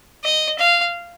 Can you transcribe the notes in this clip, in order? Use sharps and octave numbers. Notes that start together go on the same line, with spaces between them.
D#5
F5